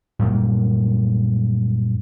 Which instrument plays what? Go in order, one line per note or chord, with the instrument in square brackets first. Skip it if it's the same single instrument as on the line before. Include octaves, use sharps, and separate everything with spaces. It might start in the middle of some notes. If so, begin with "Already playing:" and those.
[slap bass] F#2 A#2 G3 A#3